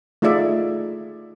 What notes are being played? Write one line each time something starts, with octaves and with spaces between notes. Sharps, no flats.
A3 D#4 F4 G#4 D5 E5